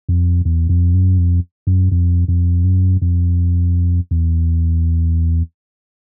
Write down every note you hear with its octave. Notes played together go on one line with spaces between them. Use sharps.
F2
E2
F2
F#2
F2
F#2
F2
F2
F#2
F2
E2